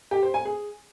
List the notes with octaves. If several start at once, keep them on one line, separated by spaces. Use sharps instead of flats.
G4
C5
G#5
G#4